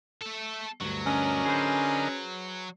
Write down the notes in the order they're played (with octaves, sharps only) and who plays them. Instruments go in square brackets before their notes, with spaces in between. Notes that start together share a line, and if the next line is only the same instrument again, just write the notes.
[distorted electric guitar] A3 A4
[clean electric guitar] D2 G2 [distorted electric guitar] F#3
[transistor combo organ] D3 A#4 D#5 [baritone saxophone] C#4
[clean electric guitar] G#4 B4 C5